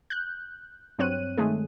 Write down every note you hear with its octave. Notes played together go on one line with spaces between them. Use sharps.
F#6 G6
G2 F#3 C4 C#5 F#6 D#7
D#3 G#3 A3 G#4